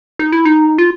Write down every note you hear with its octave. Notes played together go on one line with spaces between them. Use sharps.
D#4
E4
D#4
F4